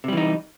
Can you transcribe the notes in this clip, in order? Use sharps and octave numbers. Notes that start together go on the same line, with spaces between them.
C3 E3 G3 D#4